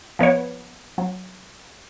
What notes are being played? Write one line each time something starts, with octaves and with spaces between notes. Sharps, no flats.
F3 B3 B4 C#5
F#3